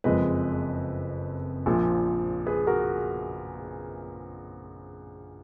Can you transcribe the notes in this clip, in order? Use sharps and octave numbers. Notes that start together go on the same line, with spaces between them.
F#1 F2 F3 G#3 B4 D#5
A#1 A#2 F3
G#4 B4
F#4 A#4